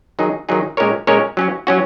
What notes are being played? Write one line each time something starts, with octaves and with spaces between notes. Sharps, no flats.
D#3 F#3 D#4 G#4
D#3 F#3 D#4 G#4
A#2 G#3 C#4 A#4 C#5
A#2 G#3 C#4 A#4 C#5
F#3 C#4 F#4
F#3 C#4 F#4